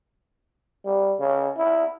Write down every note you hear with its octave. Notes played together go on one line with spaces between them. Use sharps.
G3
C#3
E4